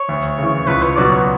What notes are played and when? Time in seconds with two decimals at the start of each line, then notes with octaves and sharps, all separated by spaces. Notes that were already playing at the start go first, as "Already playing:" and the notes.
Already playing: C#5
0.09 D2
0.38 C#3 E3
0.67 C#2 B4
0.82 C#5
0.97 B2 F#3 B3 F#4 D5
1.12 C#5